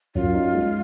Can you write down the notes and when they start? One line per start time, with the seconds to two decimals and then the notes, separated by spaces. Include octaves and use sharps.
0.15 F#2 F4
0.34 D#4
0.54 G#3